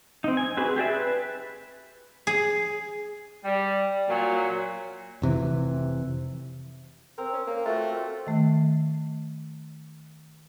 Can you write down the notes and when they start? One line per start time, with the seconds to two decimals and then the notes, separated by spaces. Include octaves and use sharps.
0.24 C4 D#4
0.37 G#5
0.57 C4 F#4 G#4 B4
0.76 G4 G#4 D5 E5
0.91 B4
2.27 G#4
3.44 G3
4.08 A#2 F#3
5.22 F1 C3 E3
7.18 C4 A#4
7.33 C#4
7.47 A#3
7.65 A3 F4 F#4
8.27 D#3 A3